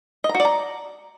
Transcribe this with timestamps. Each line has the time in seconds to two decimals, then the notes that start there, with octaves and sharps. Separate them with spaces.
0.24 D#5
0.29 A#5
0.35 F#4
0.40 D5
0.45 A#5